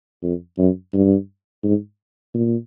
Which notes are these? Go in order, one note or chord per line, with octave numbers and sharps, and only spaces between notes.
F2
F#2
G2
G#2
A#2